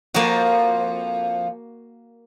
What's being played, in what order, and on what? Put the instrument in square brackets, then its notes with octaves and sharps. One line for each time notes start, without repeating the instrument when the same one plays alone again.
[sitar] F2 F3 [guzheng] A#3 F#4